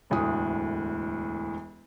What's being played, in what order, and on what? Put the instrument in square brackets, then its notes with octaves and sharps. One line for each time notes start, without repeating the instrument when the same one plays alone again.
[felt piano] E1 D2 A2 D#6